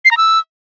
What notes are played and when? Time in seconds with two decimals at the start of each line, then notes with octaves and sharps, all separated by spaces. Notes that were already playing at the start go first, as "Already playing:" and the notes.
0.05 C7
0.11 A#5
0.17 E6